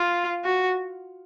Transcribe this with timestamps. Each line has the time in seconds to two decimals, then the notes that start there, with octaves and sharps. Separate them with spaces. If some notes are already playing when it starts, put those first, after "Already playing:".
Already playing: F4
0.45 F#4